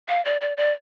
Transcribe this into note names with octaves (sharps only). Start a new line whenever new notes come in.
F5
D5
D5
D5